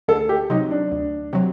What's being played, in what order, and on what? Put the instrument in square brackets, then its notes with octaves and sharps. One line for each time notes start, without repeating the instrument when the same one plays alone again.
[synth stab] D2 [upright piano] A4
[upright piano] G4
[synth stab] C3 F#3 [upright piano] D#4
[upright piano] D4
[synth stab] D2
C3 F#3